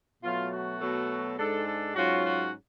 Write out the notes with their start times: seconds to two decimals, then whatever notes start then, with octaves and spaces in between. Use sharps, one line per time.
0.23 B2 F#3 A3 F4
0.52 F#4
0.80 B2 F#3 A3
1.37 G#2 G#3 D4 A4
1.66 A4
1.95 G#2 F#3 C#4 F4 F#4
2.24 F#4